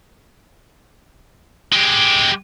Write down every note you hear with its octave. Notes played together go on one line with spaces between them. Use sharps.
G#3 G4